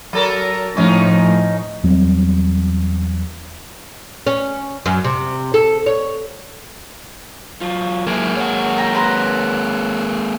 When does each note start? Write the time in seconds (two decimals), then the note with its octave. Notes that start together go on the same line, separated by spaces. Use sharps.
0.13 F#3 A4 A#4
0.77 A2 F3 C#4 D#4
1.83 E2 F#3 G3 C4
4.27 C#4
4.86 F#2
5.04 C3
5.54 A4
5.86 C#5
7.61 F#3 F4
8.07 F#3 G#3 A#3 E4
8.37 C#5 F#5
8.78 G5 A#5
8.95 B4 C5 A#5